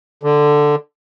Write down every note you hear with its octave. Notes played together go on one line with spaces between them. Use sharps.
D3